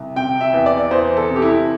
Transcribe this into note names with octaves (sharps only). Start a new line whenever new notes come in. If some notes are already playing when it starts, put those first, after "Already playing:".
Already playing: C2
C3 G5
E5
E2
D5
E2 C5
A4
C3
G4
E4